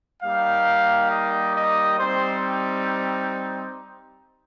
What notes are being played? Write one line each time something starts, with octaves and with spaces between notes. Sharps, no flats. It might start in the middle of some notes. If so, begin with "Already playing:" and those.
G3 A#3 D#4 G4 F5
D#5
D#5
G3 C4 D#4 C5